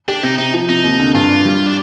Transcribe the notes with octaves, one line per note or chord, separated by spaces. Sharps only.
D4 G4
C3 D#4
C3 D#4
F3
C3 D#4
D#2
D3
G2 F4
D4
G3
D4